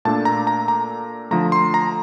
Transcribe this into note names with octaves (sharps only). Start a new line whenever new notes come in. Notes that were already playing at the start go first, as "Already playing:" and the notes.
A#2 A3 D4 A5
A#5
A#5
A#5
D3 F3 A3 A#5
C6
A#5